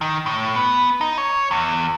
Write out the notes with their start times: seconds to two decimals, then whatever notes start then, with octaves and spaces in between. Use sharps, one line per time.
0.01 D#3
0.26 A2
0.56 B3
1.01 D#4
1.18 C#5
1.51 E2